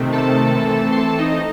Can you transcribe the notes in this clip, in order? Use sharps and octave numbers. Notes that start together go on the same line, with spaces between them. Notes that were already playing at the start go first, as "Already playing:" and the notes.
Already playing: C3 D#3 A3 C4
A4 A5
E3 A3 C4
C6
A4 A5
D#4 D#5